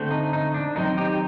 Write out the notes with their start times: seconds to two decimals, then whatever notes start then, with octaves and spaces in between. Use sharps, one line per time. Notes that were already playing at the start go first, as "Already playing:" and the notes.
Already playing: D3 A3 C4
0.11 D#4
0.33 D#4
0.54 D4
0.75 D#3 F#3 C4 D#4
0.97 D#4 G4